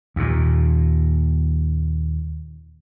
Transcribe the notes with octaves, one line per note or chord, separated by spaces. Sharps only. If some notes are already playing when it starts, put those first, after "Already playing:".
D#2 A#2